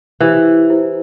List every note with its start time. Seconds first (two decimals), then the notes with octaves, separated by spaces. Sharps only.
0.20 E3 E4 G4 C5
0.70 E4 G4 C5